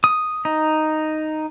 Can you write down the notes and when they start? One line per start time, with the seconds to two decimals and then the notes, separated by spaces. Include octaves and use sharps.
0.04 D#6
0.45 D#4